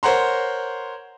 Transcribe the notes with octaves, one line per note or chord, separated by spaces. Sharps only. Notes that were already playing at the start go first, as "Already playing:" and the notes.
A#4 C5 C#5 F#5 A#5 C6